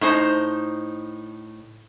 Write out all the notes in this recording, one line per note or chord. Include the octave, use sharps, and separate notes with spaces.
A2 D#4 C5 A5